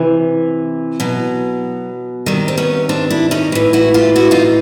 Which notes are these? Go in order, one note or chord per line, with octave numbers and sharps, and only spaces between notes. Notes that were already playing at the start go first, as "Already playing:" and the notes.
Already playing: C3 E3
B2 F#3
C3 D#3 G3
C4
B3 C#4
C4 D4
D4 E4
C#4 D#4
A2 E3
E4 F#4
F4 G4
E4 F#4
D#4 F4